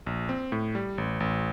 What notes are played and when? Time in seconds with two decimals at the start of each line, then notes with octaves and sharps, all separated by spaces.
0.06 A#1
0.29 C4
0.52 A2
0.75 G3
0.98 A1
1.20 A1